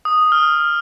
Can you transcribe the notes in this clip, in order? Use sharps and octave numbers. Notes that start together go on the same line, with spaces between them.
D#6
F6